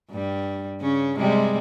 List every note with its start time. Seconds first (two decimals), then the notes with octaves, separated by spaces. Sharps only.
0.11 G2 G3
0.81 C#3 C#4
1.19 C3 G3 G#3